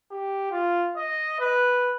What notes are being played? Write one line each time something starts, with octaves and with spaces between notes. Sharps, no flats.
G4
F4
D#5
B4